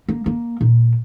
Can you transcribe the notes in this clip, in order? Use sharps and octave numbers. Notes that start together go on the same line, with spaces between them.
A#3
A#3
A#2